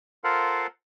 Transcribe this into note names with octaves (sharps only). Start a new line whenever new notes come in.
F4 A4 A#4 C5 F5 F#5